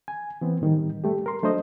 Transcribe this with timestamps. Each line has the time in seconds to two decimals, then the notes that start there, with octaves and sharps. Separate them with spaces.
0.08 G#5
0.41 E3 B3 C4
0.61 A2 D#3 G3
1.04 G3 A3 G4
1.26 A#4 C6
1.43 F#3 A3 D4 C5 D#5